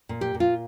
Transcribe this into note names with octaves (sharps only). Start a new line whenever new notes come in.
A#2
G4
A#2
F4